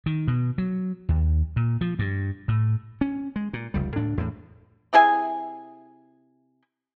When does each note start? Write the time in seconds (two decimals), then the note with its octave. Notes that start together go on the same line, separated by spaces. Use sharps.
0.06 D#3
0.28 B2
0.58 F#3
1.09 D#2
1.56 A#2
1.81 F3
1.99 G2
2.48 A2
3.01 C#4
3.36 G#3
3.53 A#2
3.74 F1 C#2 G3
3.96 D2 A2 D4
4.17 E2 A2
4.93 C3 E4 G#4 G#5